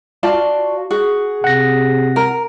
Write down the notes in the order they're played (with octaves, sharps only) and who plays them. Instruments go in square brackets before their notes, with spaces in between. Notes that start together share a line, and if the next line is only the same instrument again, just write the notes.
[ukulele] F4 D5 A5 [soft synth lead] F#4
[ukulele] F#4 [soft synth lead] G#4
[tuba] C3 [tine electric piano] F#5 A#6
[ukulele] A#4